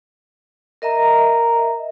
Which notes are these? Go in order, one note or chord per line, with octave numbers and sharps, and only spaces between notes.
A#4 D#5 E5 A#5